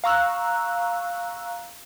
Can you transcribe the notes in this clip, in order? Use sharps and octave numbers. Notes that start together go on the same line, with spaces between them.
F5 A#5 C#6 E6 F#6